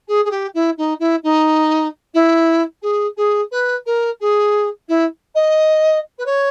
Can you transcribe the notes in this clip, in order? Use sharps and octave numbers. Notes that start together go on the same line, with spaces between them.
G#4
G#4
G4
E4
D#4
E4
D#4
E4
G#4
G#4
B4
A#4
G#4
E4
D#5
B4
C#5